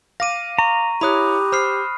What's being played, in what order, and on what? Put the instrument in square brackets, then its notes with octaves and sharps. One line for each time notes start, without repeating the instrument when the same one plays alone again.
[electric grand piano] F5 D6 [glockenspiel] A#6 D#7
[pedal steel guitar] A#5 [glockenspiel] C#6
[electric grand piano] E4 C#5 [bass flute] G4 [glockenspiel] B5 D#6 F#6
[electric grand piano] C5 [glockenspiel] B5 F6 C7